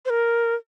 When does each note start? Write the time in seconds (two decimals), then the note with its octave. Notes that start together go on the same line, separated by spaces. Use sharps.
0.05 C5
0.10 A#4